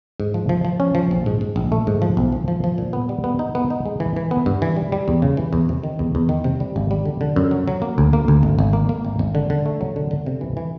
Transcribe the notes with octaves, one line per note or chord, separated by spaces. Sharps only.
G#2
F3
F3
F3
C#4
F3
A#1
G#2
G#2
A#1
A3
G#2
F3
B1
F3
F3
F3
A#2
B3
G3
B3
D#4
B3
D#4
G#3
E3
E3
B3
G2
E3
G3
G3
E2
C#3
E3
E2
C3
D#3
E2
E2
D#3
C3
G3
G#1
G3
D3
D3
F#2
F#3
F#3
A#3
D2
A#3
D2
G#1
G#1
A#3
A#3
G#1
G#1
D3
D3
A3
F#3
D3
D3
C3
E3
E3